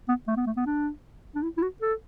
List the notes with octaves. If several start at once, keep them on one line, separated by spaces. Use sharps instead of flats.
B3
A3
B3
A3
B3
D4
D4
E4
E4
F#4
A4